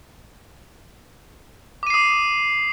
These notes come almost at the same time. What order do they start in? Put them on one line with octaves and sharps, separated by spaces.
D6 D#7 C7 D#6